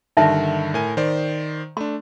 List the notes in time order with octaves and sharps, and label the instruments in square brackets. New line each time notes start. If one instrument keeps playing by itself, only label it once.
[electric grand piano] G2 D3 D#3 [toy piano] D#4 E5 A5
[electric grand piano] A2 A#4 G#5
D#3 C5 D5
[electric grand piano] A3 D4 [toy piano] C6